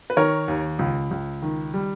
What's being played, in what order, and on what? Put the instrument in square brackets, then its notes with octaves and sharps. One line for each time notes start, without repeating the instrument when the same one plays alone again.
[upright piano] B4
D#3 A#4 C#5
D#2
C#2
C#2
D#3
G3